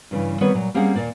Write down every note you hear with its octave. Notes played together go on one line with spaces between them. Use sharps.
G2 C#3 E3
D#3 G3 B3 C4 B4 C#5
A#2 F#3
G3 A#3 C4 C#4 G#4 F#5
D#2 A#2 A#3 D5